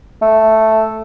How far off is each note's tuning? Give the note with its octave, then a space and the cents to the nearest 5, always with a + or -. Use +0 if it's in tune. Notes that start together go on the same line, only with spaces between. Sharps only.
A3 +0